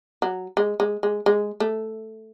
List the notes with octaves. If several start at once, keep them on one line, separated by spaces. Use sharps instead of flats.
F#3
G#3
G#3
G#3
G#3
A3